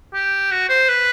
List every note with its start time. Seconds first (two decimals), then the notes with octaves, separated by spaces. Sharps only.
0.14 G4
0.51 F#4
0.69 C5
0.88 B4